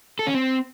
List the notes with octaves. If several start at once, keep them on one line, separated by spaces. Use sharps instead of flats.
A4
C#4
C4